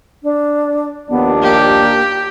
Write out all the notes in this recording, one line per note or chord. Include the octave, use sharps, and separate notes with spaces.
D4
D#2 F3 B3 D4
A#3 G4